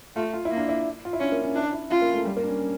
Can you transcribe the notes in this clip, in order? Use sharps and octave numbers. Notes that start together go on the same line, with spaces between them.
A3 F4
F4
E4
A#3
D4
E4
F4
E4
C#4 D4
A#3
C#4
D4 E4
E4
C#4 F4
A#3
A3
G3
A#3
D4
C#4
C#4